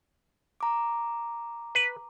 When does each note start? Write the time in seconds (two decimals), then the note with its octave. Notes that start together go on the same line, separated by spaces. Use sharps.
0.61 A#5 D6
1.75 B4